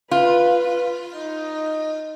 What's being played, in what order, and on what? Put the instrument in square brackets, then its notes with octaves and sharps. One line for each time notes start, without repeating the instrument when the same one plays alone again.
[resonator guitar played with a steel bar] F4 [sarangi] B4
[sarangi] D#4